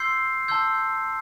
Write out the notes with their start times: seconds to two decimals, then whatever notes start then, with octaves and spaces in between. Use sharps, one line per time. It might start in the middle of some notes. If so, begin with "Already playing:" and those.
Already playing: C6 E6 G6 C7
0.48 A5 C6 E6 G6